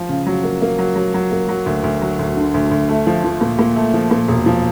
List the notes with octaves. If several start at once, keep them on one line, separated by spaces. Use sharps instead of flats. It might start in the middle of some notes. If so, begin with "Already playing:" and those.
Already playing: F3
C#3
F#3
A#3
A#3
F#3
F#3
F#3
A#3
F#3
D2
D2
F#3
D2
D3
D2
D2
A3
F3
F3
A#2
A#2
A3
F3
A#2
E1
F3